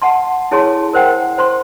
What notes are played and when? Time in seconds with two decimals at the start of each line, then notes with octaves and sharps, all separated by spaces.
0.02 F#5 A5 C6
0.51 E4 G#4 A4 C#5 A5 C6
0.93 A#4 C5 F#5 G5
1.38 C5 B5 C6